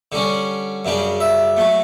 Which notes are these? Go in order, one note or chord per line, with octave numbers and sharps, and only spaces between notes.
D3 G3 C#4
F#2 C#3 G3 D4
E5
F#3 A3